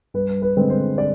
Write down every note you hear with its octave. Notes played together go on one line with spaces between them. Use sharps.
G2 B4
B4
D3 G#3 C4
C5
D5